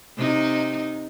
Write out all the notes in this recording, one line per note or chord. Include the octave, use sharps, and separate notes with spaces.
C3 D#4